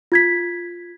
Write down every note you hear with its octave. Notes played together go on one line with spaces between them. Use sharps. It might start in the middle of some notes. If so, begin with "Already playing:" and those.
F4 G#6 B6